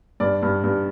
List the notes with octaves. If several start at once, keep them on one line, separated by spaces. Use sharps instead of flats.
G2 D5
G2
G2